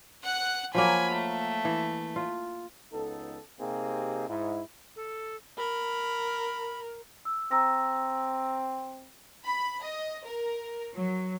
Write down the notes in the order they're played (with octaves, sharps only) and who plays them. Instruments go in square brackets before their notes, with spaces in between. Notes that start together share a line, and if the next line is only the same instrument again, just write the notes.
[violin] F#5 F#6
[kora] F3 F#3 A#3 [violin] G#5 B5
[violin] A3
[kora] E3
F4
[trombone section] C#2 B3 D#4 A4
C3 A#3 C4 D#4 G4 G#4
G#2 E4
[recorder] A4
[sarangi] A#4 [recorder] B5
[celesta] E6
[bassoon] C4 [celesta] A#5 E6 A#6
[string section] B5
D#5
A#4
F#3